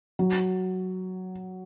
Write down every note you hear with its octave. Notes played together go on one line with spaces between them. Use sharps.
F#3